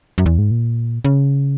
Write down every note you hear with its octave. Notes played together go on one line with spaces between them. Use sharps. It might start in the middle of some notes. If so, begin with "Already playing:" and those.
F#2
E2
G#2
A#2
C#3